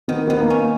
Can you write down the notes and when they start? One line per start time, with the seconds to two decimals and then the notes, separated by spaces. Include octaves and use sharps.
0.08 D#3 B3
0.28 D#3 B3
0.40 A#3
0.50 C#4